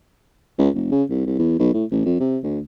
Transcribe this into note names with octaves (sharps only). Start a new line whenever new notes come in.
C#2
F1
C#3
C2
C2
E2
B1
A2
A1
F2
C3
D2